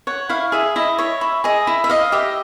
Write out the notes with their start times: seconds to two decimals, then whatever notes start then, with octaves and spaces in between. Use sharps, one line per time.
0.07 C#5 F#5
0.29 E4 F5
0.52 G#4 E5
0.76 E4 D#5
0.99 C#5 E5
1.21 E4
1.44 G#4 D#5
1.67 E4
1.84 E5
1.90 D#5 F5
2.12 G4 E5